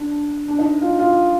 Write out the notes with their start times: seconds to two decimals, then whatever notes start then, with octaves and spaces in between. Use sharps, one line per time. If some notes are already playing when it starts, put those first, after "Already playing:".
Already playing: D4
0.48 D4
0.59 D#4
0.81 F4
0.99 F4